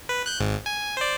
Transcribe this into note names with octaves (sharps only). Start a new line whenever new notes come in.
B4
F#6 G6
G#1 G#2
G#5
C5 D5